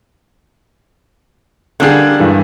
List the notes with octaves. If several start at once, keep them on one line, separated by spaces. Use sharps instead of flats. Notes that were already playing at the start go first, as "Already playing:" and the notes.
D3 G3 A#3 D4 G#4
G2 D#3 E3